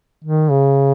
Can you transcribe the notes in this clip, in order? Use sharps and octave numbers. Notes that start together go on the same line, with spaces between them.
D#3
C#3